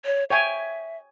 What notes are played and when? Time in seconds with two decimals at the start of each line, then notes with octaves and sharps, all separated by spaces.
0.05 C#5
0.30 C#5 E5 G5 G#5